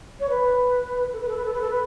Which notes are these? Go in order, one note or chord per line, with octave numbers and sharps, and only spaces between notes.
C#5
B4
A4
B4
A4
B4
A4
B4
A4
B4